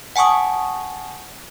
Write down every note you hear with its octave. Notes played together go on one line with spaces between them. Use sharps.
F#5 G#5 A5 C#6 D#6